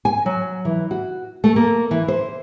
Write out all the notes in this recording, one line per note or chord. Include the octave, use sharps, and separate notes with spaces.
G#5
F#3
E3
F#4
A3
A#3
E3
C5